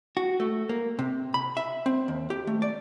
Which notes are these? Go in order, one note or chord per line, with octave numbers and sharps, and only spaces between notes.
F#4
A3
A#3
C3
B5
E5
C4
D#2
G4
A3
D5